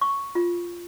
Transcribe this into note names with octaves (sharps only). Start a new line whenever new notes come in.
C#6
F4